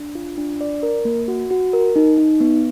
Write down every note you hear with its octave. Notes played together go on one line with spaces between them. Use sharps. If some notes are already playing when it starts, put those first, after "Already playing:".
Already playing: D4
F4
D4
D5
A#4
A#3
F#4
F#4
A#4
D#4
D#4
B3